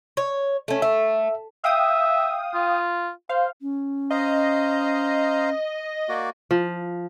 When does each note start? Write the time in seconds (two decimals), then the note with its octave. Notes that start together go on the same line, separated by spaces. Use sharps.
0.17 C#5
0.68 A3 C#4
0.82 A3 E5
1.64 E5 F5 G5 D#6
2.54 F4
3.29 C5 F5
3.61 C#4
4.11 C5 D#5 F5 A#5
6.09 A#3 F#4 D5
6.51 F3